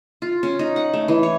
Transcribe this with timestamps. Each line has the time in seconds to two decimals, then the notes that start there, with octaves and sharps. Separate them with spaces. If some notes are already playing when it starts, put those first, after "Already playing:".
0.22 F4
0.43 C#4
0.59 D#4
0.76 F#5
0.93 A3
1.08 E3
1.23 C#5